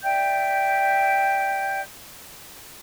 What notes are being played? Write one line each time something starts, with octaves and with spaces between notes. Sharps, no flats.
D5 E5 G5 G6